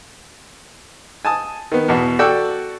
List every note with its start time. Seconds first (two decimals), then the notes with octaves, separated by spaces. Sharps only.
1.25 G#5 A5 D#6
1.72 D#3 B3
1.88 E2 B2 B3
2.19 F#4 A4 D5 G5 A5 E6